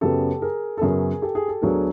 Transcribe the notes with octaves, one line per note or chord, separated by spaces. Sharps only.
F#2 C#3 F#3 B3 G4 A4
G#4 A#4
A4
F#2 C#3 F#3 B3 G#4 A#4
G4 A4
G#4
A4
D2 D3 F#3 B3 D4 G#4 A#4